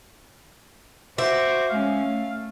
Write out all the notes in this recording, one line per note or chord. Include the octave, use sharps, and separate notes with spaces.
F#4 C5 E5 D6
G#3 C#4 F5
A3